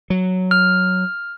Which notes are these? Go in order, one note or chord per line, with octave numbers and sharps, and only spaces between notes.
F#3
F6